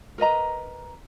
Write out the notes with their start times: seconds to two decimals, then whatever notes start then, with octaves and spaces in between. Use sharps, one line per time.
0.18 A#4 B4 D#5 A#5